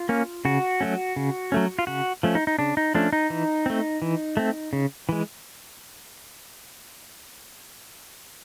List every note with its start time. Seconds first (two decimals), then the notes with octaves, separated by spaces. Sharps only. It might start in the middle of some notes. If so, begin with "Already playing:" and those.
Already playing: F4
0.09 A#3 C#4
0.45 C#3 F#4
0.81 F#3 A3 C#4
1.16 C#3
1.52 F#3 A3 C#4
1.79 F4
1.87 C#3 F#4
2.23 F3 A3 C#4
2.35 D#4
2.47 D#4
2.59 C#3 D4
2.77 D#4
2.94 F3 A3 C#4 D4
3.13 D#4
3.30 E3
3.66 A3 C4
4.02 E3
4.37 A3 C4
4.73 C#3
5.09 E3 G#3